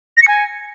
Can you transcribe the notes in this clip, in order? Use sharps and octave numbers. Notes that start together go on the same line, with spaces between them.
A#6
C#7
G#5